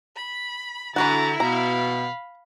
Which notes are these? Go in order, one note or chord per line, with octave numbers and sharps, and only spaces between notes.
B5
D3 E3 E4 F#4 F#5 A#5 A6
B2 F5 A#5 B5